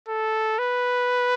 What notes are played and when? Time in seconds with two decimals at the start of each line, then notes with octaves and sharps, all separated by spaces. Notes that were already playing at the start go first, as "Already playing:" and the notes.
0.09 A4
0.59 B4